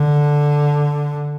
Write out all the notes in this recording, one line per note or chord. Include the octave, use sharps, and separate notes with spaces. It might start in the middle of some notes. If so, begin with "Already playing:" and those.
Already playing: D3